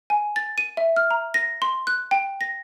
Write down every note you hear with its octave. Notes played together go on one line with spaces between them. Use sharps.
G#5
A6
D#7
E5
F6
A#5
A#6
C6
F#6
G5
A#6